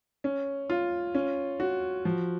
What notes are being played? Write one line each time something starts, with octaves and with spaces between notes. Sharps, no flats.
C#4
F4
C#4
F#4
F3